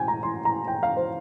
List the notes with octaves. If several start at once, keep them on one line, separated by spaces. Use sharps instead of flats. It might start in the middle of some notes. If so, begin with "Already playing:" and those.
Already playing: G5 G#5
A#5
C6
A#5
G5
F5
C5